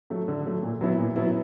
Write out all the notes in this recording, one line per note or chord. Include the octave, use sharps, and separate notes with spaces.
F#3 A3
D3
F#3 A3
A#2
F#3 B3 E4
A#2
F#3 B3 E4